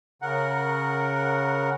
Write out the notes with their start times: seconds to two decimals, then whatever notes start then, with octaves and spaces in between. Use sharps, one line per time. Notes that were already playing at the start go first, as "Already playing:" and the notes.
0.22 C#3 A#4 F#5